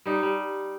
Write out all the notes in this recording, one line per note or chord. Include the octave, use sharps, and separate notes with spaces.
G3 D#4
G3